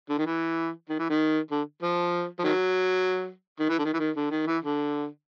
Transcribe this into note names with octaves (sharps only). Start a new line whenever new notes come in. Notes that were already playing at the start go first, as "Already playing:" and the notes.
D3
D#3
E3
D#3
E3
D#3
D3
F3
F3
D#3 F#3
D#3
E3
D3
D#3
E3
D#3
D3
D#3
E3
D3